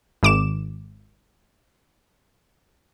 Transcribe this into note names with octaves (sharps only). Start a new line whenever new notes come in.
G#1 D6 E7